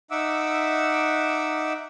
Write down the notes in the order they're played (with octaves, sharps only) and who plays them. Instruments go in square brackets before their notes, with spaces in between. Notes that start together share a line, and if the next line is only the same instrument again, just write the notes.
[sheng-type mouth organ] D#4 E5 F#5 D6 E6